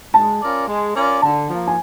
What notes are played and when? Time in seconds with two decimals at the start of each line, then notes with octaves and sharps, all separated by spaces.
0.14 G#3 A5
0.41 C#4 F4 A#4 D5
0.68 G#3
0.95 C#4 F4 A#4 D5
1.22 D3 A5
1.49 F3 A#3
1.67 G#5